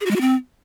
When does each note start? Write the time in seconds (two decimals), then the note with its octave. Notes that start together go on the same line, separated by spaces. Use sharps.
0.01 G#4
0.06 F#4
0.11 G#3
0.16 F#4
0.21 C4